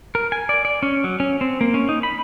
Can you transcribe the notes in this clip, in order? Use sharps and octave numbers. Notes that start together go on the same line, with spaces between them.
A#4
G#5
D5
D5
C#4
F#3
C#4
C4
A#3
C#4
D#4
B5